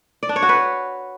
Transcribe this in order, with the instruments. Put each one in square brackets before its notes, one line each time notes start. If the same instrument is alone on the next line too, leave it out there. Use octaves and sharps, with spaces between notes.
[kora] D5
D4
C#5
F#4
B4